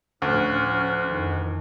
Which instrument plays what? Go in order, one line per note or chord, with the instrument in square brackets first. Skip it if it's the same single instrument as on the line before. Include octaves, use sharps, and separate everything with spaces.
[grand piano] D2 [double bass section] A2 F3 [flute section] C#4 F6 F#6
[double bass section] F2 D#3 E3